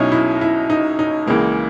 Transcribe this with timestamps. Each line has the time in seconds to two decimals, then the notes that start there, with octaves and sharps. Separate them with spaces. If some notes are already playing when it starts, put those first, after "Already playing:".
Already playing: B1 B2 F#3 C#4 D#4 E4
0.12 E4
0.41 E4
0.70 D#4
0.99 D#4
1.26 C#2 C#3 E3 G#3 A#3